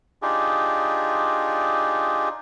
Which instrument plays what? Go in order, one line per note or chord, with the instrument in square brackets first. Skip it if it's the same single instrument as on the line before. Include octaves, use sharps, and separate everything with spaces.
[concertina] D4 D#4 F4 G4 G#4